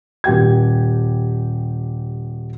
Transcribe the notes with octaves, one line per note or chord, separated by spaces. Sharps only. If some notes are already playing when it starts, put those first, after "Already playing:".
D#1 G4 G5 G#6